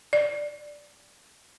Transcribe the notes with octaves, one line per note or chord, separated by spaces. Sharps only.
D5